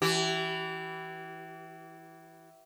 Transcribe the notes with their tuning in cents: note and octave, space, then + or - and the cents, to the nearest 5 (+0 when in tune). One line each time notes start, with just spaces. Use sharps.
E3 +0 G4 -40